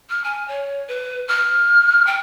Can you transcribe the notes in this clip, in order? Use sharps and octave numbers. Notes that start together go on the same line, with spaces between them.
F6
G#5
C#5
B4
F6
G5